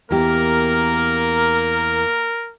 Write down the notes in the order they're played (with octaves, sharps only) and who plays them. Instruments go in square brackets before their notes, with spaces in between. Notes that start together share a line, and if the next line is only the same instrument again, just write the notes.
[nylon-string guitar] E2 G4 [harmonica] A#3 [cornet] A#4